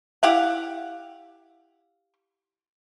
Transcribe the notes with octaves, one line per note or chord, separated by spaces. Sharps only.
E4 G4 F5 F#5